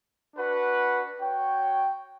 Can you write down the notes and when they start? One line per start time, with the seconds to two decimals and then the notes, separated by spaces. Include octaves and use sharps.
0.35 D4 F#4 B4 F#5
1.20 F#4 C#5 G5